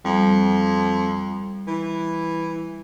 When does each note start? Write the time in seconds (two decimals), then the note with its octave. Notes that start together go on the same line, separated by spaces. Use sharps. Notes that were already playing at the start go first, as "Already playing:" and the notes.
0.05 F2 G3
1.67 E3